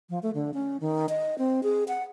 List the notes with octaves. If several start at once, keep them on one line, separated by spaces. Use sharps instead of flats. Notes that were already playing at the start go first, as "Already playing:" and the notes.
F3
A3
D3
C#4
D#3
D#5
C4
G#4
F#5